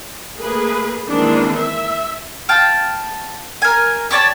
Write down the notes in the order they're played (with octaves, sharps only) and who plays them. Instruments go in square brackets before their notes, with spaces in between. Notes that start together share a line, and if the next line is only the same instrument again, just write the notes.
[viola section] A3 A#3 G#4 A#4 B4
D#3 E3 G#3 A#3 C4 D4
E5
[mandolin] F5 G5 A5
A#4 G#5
G4 C#5 D5 A5